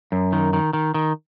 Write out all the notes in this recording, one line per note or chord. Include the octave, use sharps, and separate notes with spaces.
F#2
D#3
D#3
D#3
D#3